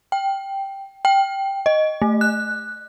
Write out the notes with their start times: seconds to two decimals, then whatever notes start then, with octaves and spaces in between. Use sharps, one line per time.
0.12 G5
1.05 G5
1.66 D#5
2.02 A3
2.21 F#6